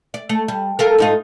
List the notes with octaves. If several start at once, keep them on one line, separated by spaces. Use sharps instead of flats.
D5
A3
G3
F4 A4 A#4
G#2 D#4 F4